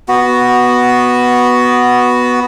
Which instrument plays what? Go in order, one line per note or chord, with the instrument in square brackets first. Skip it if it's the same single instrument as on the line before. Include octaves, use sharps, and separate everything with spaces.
[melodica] B3 F#4